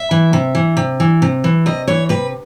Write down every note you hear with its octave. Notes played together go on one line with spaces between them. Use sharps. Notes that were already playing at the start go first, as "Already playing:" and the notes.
Already playing: E5
E3
C3
E3
C3
E3
C3
E3
C3 D#5
E3 C#5
C3 B4